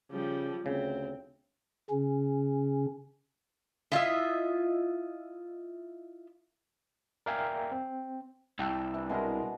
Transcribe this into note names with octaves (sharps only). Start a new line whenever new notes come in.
C#3 F3 G3
D2 C#3 C4
C#3 C#4
E4 F4 D#5 E5
A#4 D5 E5 F5 G5 G#5
C4
C2 G5 A5 E6
E3 D4
B2 G#3 E4 A#4 C6